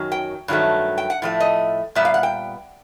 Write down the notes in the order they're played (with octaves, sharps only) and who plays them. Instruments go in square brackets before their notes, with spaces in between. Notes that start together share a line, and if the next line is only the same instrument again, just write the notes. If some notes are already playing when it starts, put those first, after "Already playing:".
Already playing: [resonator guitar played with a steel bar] F#2 D#3 F#3
G5
G2 D#3 F#3 A3
G5
F#5
A2 F3 A3
D#5
A#2 G3 B3 E5
F5
F#5
G5